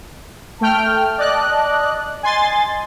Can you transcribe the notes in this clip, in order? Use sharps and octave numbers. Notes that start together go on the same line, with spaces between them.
A3 G5 A5 F6
D5 D#5 F#6
D#5 G#5 C6 A6